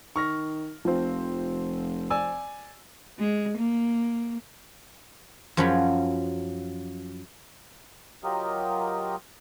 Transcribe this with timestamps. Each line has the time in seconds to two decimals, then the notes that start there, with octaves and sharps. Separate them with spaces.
0.16 D#3 C#6 F6 A#6
0.85 F1 F3 C4
2.10 D5 G#5 E6
3.19 G#3
3.58 A#3
5.57 F#2 F3 F#3 C#4 B5
8.24 F#3 F4 G4 A#4 D#5